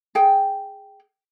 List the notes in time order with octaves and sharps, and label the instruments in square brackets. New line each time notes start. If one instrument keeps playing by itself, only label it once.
[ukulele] G#4 G5